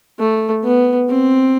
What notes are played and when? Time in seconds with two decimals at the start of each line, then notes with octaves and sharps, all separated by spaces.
0.19 A3
0.63 B3
1.09 C4